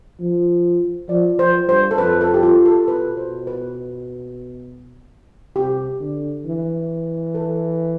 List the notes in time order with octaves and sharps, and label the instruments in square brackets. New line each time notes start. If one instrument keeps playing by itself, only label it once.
[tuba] F3
[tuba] F3 [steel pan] D5
[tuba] F3 [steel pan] C5
[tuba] G2 [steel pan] C5
[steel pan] A4
[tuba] F2 [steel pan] B4
[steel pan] A4
G4
F4
A4
[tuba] B2 [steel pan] B4
[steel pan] C5
B4
[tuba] C3 [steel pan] G4
[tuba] D3
E3
[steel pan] A4